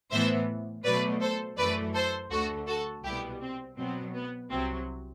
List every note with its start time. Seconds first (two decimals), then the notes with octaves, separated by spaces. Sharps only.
0.11 A2 E3 B3 C5 E5
0.84 B2 F#3 A3 B4 D5
1.21 A4 C5
1.57 F#2 E3 A3 B4 D5
1.94 A4 C5
2.31 D2 D3 A3 F#4 A4
2.67 F#4 A4
3.04 C2 B2 G3 B3 E4 G4
3.41 C4
3.77 B2 F#3 B3 C4
4.13 B3
4.50 C2 C3 F#3 C4